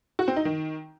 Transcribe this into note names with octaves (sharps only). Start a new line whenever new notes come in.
F#4
C4
D#4
D#3